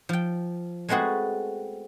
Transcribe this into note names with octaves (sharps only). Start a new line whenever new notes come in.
F3 G5
G#3 A3 B3 C4 F#4 G#4